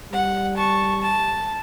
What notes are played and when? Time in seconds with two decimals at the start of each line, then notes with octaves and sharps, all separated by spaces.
0.13 G3 F#5
0.57 A5 C#6
1.02 A5